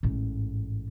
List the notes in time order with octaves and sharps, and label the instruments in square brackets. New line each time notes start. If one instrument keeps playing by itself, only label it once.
[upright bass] A1 G#2